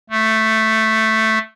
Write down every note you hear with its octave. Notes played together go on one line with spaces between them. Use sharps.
A3